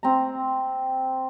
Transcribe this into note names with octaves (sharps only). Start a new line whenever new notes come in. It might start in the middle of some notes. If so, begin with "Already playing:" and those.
C4 A#5